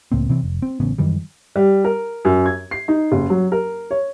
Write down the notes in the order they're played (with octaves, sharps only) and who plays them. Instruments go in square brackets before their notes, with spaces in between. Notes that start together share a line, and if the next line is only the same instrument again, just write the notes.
[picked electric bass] C#2 A2 A#3 C4
C3 E3 C4
F1
C4
A1 C#3 B3
F#2 D#3 E3 G3
[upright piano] G3
A#4
F#2
G#6
C7
D#4
F#1
F#3
A#4
C#5